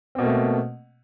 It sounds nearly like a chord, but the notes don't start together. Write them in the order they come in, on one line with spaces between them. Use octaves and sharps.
C4 B2 A#3 A3